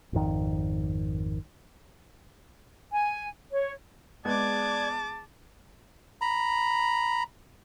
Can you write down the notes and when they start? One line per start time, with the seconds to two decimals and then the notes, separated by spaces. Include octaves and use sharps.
0.13 G#1 F2 D#3
2.91 G#5
3.51 C#5
4.25 G#3 B3 G#4 D5 A5 D6 G#6
6.21 A#5 B5